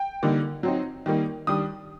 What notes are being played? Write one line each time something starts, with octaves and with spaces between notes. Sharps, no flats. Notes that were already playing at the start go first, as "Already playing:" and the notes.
Already playing: G5
D3 G3 A#3 D#4
F#3 C4 D#4
D#3 G3 A#3 D#4
D#3 G3 D4 D#6